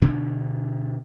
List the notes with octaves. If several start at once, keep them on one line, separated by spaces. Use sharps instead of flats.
D2 B2 D3 D4